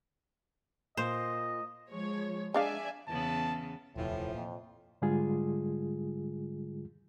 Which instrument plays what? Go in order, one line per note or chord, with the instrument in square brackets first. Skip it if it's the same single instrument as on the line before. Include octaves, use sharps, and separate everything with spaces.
[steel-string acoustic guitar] A#2 [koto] C5 [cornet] D#5
[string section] F3 G#3 C#5
[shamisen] G#3 D4 F5 [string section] D5 E5 G#5
[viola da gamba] E2 C#3 B3 [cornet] A5
[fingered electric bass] D#1 F2 C3 [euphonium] A2 [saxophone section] E3 F3
[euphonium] F2 [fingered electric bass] A#2
[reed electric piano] G#2 D3 G3 G#3 F4 G#4